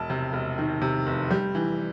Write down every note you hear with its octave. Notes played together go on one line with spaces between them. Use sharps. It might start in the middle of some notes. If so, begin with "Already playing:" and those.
Already playing: E1 A5
C3
E1
D#3
C3
F1
G3
E3